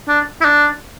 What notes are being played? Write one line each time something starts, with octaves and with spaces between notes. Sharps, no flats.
D4
E4
D4